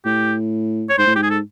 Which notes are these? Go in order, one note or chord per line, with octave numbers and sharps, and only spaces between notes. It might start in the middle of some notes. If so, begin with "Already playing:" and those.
A2 G4
C#5
G#2 C5
A2
G#2 G4
G#4
A4